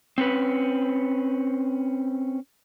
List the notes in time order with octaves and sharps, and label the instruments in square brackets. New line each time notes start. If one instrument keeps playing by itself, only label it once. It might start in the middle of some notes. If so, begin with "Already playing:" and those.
[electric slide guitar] C4 C#4 B4